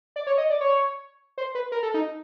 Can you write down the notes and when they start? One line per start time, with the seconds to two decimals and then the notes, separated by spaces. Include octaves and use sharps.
0.16 D5
0.27 C#5
0.38 D#5
0.50 D5
0.61 C#5
1.38 C5
1.55 B4
1.72 A#4
1.83 A4
1.94 D#4